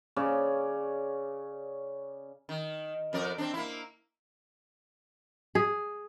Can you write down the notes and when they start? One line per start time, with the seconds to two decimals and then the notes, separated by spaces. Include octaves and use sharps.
0.16 C#3 C#4 D5
2.49 D#3
3.13 F2 A#4 D5
3.38 C4 D4
3.54 A#3 E4
5.55 G#4